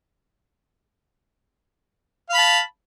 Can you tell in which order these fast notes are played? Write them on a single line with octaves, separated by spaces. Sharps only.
F5 B5 A5